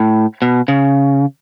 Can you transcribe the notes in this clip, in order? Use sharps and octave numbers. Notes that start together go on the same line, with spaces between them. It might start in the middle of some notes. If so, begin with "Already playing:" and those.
Already playing: A2
B2
C#3